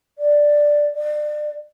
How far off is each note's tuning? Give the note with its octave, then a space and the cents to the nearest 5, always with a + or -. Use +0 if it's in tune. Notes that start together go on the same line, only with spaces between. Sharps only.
D5 +5
D5 +30